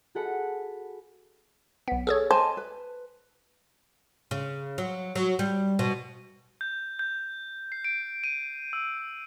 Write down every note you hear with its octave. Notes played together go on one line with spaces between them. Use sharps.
F#4 G#4 A4 F#5 B5 C#7
B1 B3
G#4 A4 C#5
C5 D#5 G#5 A5
B4
C#3
F#3
F#3
G3
B2
G6
G6
C7
D7
D#7
E6